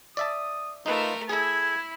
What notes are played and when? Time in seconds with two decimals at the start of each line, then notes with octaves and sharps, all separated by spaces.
0.17 D5 E5 A5 D#6
0.86 A3 D#4 F4 A#4 B4
1.29 E4 G#4 A4 G#6